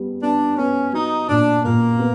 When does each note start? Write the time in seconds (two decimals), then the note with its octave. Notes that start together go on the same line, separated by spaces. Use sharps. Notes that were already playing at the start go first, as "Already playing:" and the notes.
Already playing: G3 B3
0.22 B3 D4
0.57 B3 C#4
0.93 F#3 D#4
1.29 A#2 D4
1.64 A#2 A#3
1.99 B3